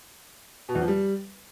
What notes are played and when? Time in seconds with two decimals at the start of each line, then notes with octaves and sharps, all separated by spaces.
0.69 B2
0.75 E2
0.81 F3
0.88 G3